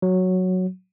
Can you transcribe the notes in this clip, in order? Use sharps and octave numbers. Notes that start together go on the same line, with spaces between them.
F#3